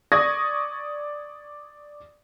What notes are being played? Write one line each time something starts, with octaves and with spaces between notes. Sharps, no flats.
D5 C#6 D#6 G#6 A#6